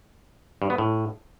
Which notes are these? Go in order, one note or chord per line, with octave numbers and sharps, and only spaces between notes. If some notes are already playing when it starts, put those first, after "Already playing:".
G2
B3
A2